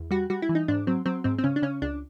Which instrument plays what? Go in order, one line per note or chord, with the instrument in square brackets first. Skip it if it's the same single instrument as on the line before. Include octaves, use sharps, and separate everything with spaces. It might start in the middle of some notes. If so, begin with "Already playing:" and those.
Already playing: [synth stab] E2
G3 F#4
G3 F#4
E4
E3
D#4
G#2 D4
F#3 C4
F#3 C4
G#2 C4
C4
C#3 C#4
D4
C#3 C#4
C#2 D4